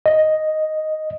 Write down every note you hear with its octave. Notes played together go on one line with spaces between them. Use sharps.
D#5